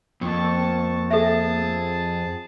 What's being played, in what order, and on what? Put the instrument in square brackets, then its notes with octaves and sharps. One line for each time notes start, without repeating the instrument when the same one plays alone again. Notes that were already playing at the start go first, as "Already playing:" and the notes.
[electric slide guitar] F2 [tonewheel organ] A#3 [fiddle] A5 C#6
[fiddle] G#4 A5 [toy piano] A4 E5